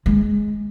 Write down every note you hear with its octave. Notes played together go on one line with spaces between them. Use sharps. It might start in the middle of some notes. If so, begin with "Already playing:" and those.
G#3